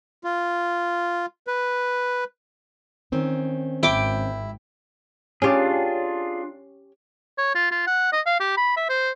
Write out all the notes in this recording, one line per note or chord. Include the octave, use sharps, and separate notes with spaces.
F4
B4
D#3 C4 C#4
G#1 E4 G5 D6
C#4 D4 F4 G4 G#4
C#5
F4
F4
F#5
D#5
F5
G4
B5
E5
C5